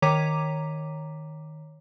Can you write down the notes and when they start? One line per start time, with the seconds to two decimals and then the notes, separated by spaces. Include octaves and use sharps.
0.02 D#3 C#5 A#5 D6 B6 D#7